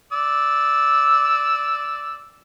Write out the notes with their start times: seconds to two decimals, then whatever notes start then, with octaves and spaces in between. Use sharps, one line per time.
0.12 D5 E6